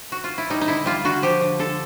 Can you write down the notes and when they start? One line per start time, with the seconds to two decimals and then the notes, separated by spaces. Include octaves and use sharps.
0.12 F#4
0.24 F4
0.38 E4
0.50 G3 D#4
0.61 D#4
0.68 D3 E4
0.86 G3 F4
1.05 D3 F#4
1.22 F3 G4
1.41 D3
1.59 D3 A4